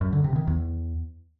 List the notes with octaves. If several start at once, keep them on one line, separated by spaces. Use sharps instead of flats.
F#2
D3
C3
D#3
E2